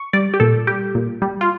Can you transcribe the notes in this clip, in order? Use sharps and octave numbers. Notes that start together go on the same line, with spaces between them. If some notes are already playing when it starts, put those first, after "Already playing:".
Already playing: C#6
G3 D5
G4
A#2 A4
G3 G4
A#2
G3
F4